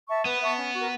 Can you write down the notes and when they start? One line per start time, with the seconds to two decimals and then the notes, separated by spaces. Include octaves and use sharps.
0.09 E5 A5 C#6
0.25 B3 B4
0.41 E5 A5 C#6
0.57 C#4
0.74 F#4 A#4